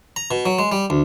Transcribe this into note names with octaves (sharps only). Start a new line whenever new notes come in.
A#5
B2
F#3
G#3
G3
D2